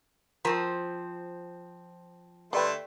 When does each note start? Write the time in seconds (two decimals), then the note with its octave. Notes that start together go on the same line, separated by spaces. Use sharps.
0.45 F3 C4 A#4
2.53 D3 G3 A3 G4 B4 D5 G5 C6